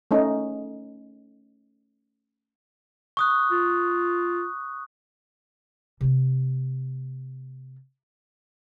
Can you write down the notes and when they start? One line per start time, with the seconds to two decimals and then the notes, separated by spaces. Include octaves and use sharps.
0.11 A3 C#4 D#4
3.17 C#6 D#6 F#6
3.52 F4
6.01 C3 A#3